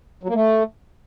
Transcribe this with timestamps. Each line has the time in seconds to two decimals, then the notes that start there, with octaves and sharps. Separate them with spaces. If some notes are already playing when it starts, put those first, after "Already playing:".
0.23 F#3
0.29 A#3
0.35 A3